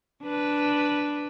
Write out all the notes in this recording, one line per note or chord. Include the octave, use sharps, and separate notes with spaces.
D4 B4